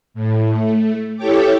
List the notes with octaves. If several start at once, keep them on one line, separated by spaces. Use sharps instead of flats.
A2
A3
E4 G4 A4 C#5 G5 D6